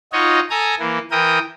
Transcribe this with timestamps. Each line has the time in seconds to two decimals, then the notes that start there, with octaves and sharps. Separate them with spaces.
0.13 D#4 F4 F#4 C#5 D#5
0.50 A4 G#5 A#5 D#6
0.79 E3 A#3
1.11 E3 A#4 G5 D#6